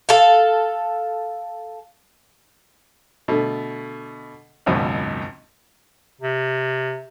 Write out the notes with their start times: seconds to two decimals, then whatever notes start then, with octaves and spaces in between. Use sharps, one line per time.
0.09 A4 F5
3.28 B2 D3 A3
4.66 G#1 C#2 F#2 B2
6.21 C3